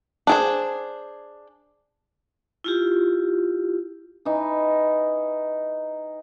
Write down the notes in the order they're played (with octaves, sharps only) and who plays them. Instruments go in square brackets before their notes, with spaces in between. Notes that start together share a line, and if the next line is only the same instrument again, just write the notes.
[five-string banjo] D4 G#4 C5
[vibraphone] E4 F4 G4
[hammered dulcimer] E3 D#4